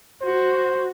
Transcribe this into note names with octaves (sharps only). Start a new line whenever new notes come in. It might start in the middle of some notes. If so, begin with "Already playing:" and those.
F#4 C5